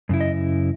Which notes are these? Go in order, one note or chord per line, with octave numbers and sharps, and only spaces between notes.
F#2 C#3 E4
D#5